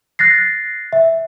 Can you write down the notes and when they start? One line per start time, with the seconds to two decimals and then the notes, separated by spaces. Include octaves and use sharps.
0.19 F#6 A6 A#6 C7
0.93 E5